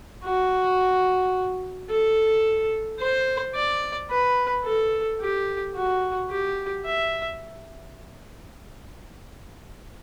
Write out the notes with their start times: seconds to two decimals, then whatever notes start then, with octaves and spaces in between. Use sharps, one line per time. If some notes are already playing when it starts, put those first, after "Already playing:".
0.25 F#4
1.90 A4
3.00 C5
3.55 D5
4.10 B4
4.65 A4
5.21 G4
5.76 F#4
6.30 G4
6.85 E5